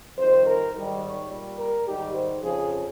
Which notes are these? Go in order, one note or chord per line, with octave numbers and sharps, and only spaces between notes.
F2 D#3 G3 C5
A#4
G#2 D#3 G3
C#5
A#2 G3
A#4
G#2 D#3 G3 G4
C5
F2 C#3 F3 G#4